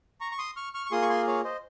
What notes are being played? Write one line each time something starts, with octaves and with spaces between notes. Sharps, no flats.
A#5 C#6
C#6
C6 D#6
C#6 F6
C#6 F6
C#6
A#3 F4 G#4 C6 D#6
C#6
G#5 C6
C#5 F5
C5 D#5